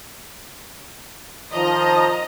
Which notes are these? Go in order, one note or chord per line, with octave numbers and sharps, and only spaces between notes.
D#3 F3 D#5 A#5